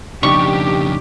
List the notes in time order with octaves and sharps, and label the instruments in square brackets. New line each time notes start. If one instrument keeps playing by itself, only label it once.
[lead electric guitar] F2 C#3 [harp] D4 D#4 [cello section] G4 [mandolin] C#6